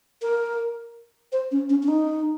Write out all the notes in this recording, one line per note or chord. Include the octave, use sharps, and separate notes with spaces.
A#4
C5
C#4
C#4
C#4
D#4